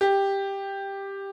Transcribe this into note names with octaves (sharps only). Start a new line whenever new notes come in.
G4